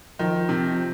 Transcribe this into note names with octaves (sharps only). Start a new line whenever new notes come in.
D#3 F3
C3